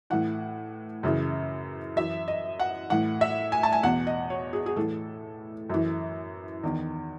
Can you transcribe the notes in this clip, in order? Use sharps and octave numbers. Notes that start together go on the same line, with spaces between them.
A2 E3 F#5
F#2 C#3 E3
F#2 E3 E5
D#5
F#5
A2 E3 F#5
E5
G#5
A5
G#5
E2 B2 F#5
D#5
C#5
G#4
G#4
A2 E3 A4
F#2 E3
E2 D#3